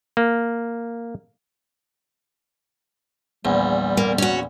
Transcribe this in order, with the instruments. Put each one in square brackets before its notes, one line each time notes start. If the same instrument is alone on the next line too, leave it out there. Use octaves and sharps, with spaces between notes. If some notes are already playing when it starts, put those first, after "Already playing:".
[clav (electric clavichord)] A#3
[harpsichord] A#1 E2 [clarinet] G3
[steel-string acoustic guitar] A#3
C#4 F#4